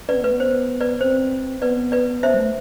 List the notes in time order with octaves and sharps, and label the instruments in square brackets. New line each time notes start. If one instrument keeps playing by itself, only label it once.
[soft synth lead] C4 [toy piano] B4 D5
[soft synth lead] B3
[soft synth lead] A3 [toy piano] B4
[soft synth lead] B3
[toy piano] C5
B4 D5
[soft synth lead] C4 [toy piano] C5
[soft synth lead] B3 [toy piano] B4 D5
[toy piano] B4 D5
[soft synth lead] B3 [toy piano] C5 E5
[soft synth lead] G3
A3